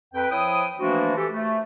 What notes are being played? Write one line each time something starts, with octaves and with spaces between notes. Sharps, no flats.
F2 B4 G5
F3 E4 C#5 G5 D#6
E3 F3 A3 A#3 D4 F#4
E3 G4 A4
A3